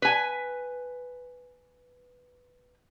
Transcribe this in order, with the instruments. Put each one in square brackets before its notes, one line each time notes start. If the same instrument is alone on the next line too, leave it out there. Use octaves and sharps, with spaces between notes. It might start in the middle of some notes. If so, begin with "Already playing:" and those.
[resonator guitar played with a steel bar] B4 G#5